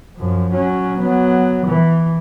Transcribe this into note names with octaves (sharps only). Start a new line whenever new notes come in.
F#2 F3
F#3 C#4
F#3 B3
E3